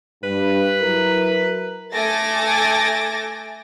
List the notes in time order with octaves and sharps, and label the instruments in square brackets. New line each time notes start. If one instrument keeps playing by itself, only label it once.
[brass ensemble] G2 [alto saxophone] B4
[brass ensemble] F#3 E4 A#4
[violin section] A3 A4 G#5 D6 A6 A#6